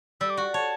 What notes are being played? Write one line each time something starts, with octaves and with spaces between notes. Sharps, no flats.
G3 E6
D6
F#4 C#6
C#5 A5